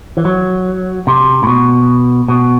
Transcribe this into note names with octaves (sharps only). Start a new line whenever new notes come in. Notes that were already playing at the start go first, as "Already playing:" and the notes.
E3
F#3
C3
A2
B2
B2